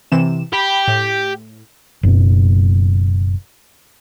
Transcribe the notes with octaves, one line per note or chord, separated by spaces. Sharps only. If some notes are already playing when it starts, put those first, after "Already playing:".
C3 E3 E7
G4 B5
A2
F#1 F#2 B2